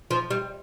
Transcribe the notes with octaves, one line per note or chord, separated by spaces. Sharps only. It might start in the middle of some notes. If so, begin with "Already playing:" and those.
F3
G3